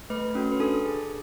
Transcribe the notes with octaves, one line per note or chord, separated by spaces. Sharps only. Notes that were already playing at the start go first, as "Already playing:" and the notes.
A3 B4
C#4 F#4 A4
B4
D4 A4
G#4